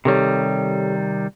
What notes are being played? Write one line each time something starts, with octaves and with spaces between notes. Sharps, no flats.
C3 D#3 G3 G4 A4 C#5